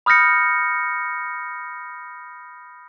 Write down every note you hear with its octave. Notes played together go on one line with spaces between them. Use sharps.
B5 D#6 F6 G6 A#6 C#7